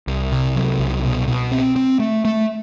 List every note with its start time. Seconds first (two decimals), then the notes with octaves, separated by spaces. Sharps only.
0.07 C2
0.32 C3
0.56 F#3
0.79 C2
1.04 B2
1.28 B2
1.51 C4
1.76 C4
1.99 A3
2.25 A3